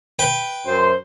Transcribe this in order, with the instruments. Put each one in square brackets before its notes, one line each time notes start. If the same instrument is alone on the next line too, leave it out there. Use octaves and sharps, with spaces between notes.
[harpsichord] B4 G5
[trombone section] F#2 C5